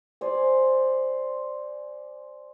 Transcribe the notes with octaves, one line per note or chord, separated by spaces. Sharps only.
C5 D5 G#5